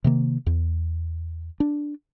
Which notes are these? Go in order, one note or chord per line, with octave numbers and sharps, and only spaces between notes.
C3 D#3 A#3
E2
D4